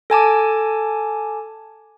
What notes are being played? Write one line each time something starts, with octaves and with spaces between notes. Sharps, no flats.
A4 G#5 A5 D6